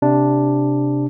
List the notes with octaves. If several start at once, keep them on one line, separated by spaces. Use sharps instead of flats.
C3 D4